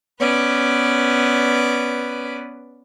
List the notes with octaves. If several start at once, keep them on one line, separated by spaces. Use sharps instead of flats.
B3 C#4 B4 D5